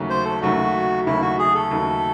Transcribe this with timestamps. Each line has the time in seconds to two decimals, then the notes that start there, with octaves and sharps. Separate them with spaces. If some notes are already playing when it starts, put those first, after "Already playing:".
Already playing: D#2 C#3 F#3 A3
0.10 C5
0.25 A4
0.42 D#2 C#3 F#3 A3 F#4
1.06 D#2 C#3 F#3 A3 E4
1.22 F#4
1.39 G#4
1.55 A4
1.70 D#2 C#3 F#3 A3